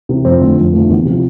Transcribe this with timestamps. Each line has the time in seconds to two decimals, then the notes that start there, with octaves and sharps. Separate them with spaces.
0.09 C3 E3
0.25 F2 C4
0.41 D3 F3 A3
0.58 F2
0.73 D3 F3 A3
0.89 E2
1.05 C3
1.10 F3